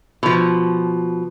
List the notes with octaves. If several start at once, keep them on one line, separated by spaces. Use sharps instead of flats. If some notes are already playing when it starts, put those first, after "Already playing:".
B2 F3